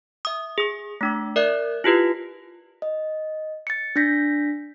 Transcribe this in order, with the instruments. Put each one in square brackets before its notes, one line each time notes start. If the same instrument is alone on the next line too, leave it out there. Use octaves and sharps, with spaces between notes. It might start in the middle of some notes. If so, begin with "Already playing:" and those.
[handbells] E5 D#6
G#4 D#6
A3 D4 D6
A#4 D5 E5 F#6
E4 F4 G4 B4
[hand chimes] D#5
A6 C#7
D4 G6 A#6 B6